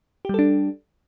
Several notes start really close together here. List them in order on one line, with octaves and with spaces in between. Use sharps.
G4 G3 A4 D4